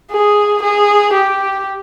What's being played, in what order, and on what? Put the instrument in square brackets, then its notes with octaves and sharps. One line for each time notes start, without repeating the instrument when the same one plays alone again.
[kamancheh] G#4
G#4
G4